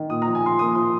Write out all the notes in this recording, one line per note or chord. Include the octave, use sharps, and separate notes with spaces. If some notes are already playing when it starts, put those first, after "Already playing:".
Already playing: D#3
A#2 D#6
A#5
F3
G#5
F3 C6
A#3 D#6
F3 C6